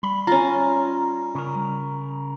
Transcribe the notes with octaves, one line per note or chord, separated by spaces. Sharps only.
G3 B5
C#4 F4 A#5
C#3 A#4